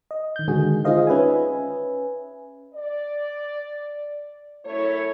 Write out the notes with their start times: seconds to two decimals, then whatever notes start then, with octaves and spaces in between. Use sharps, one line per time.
0.11 D#5
0.36 D#3 G6
0.48 D3 D#3 G#3 F#4 G#4
0.85 D#4 F4 G#4 C5 D#5 F5
1.07 C#4 B4 E5 G#5
2.74 D5
4.64 F#2 A3 E4 C#5